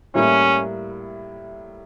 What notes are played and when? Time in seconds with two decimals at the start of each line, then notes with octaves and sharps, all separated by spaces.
0.15 A2 G3 A#3 C#4 E4